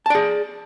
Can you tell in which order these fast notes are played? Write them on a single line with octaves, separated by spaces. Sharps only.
A5 D5 G#4